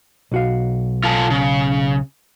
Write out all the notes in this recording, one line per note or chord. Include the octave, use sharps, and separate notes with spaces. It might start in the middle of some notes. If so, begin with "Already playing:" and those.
B1 F#4 F5
F4 A4 G#5
C#3